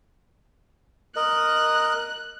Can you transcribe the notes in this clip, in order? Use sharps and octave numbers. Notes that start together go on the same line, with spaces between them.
A#4 D#5 F#6